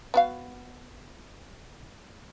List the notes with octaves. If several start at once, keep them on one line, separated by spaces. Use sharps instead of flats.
B3 F#4 F5